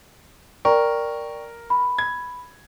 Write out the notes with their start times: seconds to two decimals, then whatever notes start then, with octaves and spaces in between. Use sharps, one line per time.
0.65 A#4 D5 G5 C#6
1.70 B5
1.98 G#6